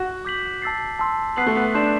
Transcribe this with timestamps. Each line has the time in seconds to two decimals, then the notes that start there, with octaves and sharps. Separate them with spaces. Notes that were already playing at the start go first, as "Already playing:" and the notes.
Already playing: F#4
0.25 D6 G6 B6 F#7
0.62 A5 E6 A6 C7
0.99 A5 C6 E6
1.36 B3 F#6 C7 F#7
1.46 A3
1.56 B3
1.74 D4 C6 G6 C7 E7